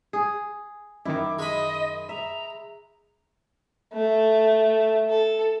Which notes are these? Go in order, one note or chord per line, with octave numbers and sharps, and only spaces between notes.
G#4
F#2 D#3 E4 D6
G#3 D#5 B5
E5 A#5
A3
A4